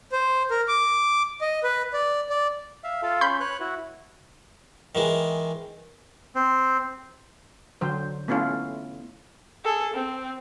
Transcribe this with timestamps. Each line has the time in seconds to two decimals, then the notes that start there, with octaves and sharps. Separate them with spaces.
0.12 C5
0.51 A#4
0.68 D6
1.41 D#5
1.63 B4
1.93 D5
2.30 D5
2.84 E5 F5
3.02 F4 A4 F5
3.21 C#4 B5 C6 G6
3.40 B4 C#5 F#6
3.60 E4 F#4
4.95 D#3 E3 G#3
6.35 C4
7.81 D3 F#3 C5
8.28 A3 B3 C#4 E4 F4
9.65 G#4 A4
9.93 C4